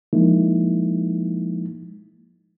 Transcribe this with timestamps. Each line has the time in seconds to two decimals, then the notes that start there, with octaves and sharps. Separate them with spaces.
0.13 F3 G#3 A#3 D#4 E4